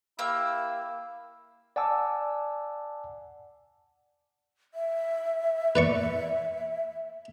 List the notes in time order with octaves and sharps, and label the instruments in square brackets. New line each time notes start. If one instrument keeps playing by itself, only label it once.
[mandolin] A#3 G4 E6 [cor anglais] E4 [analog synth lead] F5
[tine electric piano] D5 F#5 G#5 A5 D6 E6
[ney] E5
[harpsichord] B4 D5 C#6